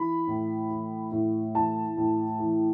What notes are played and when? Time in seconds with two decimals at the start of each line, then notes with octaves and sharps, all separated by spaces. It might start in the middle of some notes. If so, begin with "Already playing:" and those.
Already playing: E3 B5
0.27 A2
0.70 E3
1.12 A2
1.55 E3 A5
1.97 A2
2.39 E3